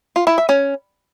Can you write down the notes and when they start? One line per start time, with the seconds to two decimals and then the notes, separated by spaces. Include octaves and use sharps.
0.16 F4
0.27 E4
0.38 E5
0.49 C#4